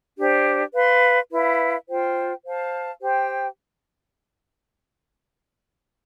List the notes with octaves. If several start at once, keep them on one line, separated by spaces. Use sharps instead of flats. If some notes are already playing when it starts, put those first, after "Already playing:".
D4 G4 C5
B4 F5 C6
E4 B4 F5
F4 C5 G5
C5 F5 A5
G4 C5 G5